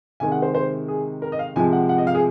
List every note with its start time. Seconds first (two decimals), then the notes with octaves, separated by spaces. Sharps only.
0.20 C3 D#3 G#3 G#5
0.32 F#5
0.42 C5
0.55 C5
0.88 G#4
1.22 A#4
1.32 D#5
1.39 F5
1.56 C3 F3 G#3 G#5
1.73 F#5
1.89 F#5
1.98 D#5
2.07 F5
2.15 G#4